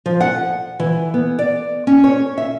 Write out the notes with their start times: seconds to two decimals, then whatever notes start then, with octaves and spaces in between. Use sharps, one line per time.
0.06 F3
0.21 F#5
0.80 E3
1.14 B3
1.39 D5
1.87 C#4
2.04 C#5
2.38 E5